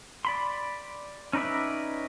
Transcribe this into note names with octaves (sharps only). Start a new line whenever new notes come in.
D5 B5 C6
C#4 D#4 B4 D5 E5